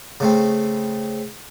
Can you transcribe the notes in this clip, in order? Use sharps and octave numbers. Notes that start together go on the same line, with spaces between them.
C#3 A3 C4